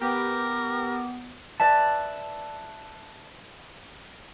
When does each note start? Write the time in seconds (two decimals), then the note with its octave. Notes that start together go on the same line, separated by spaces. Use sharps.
0.01 B3 G4 A#4 B4 G5 D6
1.60 B4 D5 E5 A5